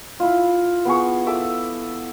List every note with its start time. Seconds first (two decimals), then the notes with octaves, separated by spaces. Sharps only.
0.20 E4 F4
0.85 B3 G#4 C#6
1.26 A4 E5 D6